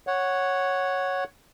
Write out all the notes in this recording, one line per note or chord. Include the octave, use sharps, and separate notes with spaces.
C#5 F#5